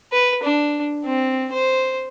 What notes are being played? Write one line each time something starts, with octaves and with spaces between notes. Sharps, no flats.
B4
D4
C4
C5